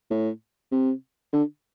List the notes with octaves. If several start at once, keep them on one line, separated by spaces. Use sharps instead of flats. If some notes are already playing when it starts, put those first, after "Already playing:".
A2
C3
D3